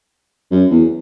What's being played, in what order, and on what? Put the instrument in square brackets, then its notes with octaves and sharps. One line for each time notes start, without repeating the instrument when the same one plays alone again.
[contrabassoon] F#2
E2